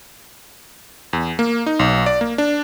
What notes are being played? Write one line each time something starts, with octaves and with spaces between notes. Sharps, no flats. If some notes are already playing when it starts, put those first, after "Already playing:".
E2
A#3
D#4
B1
D5
A#3
D4